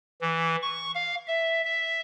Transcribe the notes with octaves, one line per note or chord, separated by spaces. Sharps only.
E3
C#6
F5
E5
E5